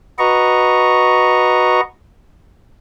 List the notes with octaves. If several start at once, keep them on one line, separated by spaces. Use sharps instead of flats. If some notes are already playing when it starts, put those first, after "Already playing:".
F#4 B4 D#5 A#5 C#6